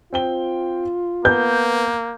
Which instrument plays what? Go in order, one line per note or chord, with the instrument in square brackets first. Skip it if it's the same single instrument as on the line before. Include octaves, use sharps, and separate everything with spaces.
[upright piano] C4 G5 G7 [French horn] F4
[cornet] A#3 [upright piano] B3 [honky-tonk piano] G6